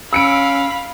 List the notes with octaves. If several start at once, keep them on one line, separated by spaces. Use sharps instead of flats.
C#4 F5 B5 E6 C#7 D7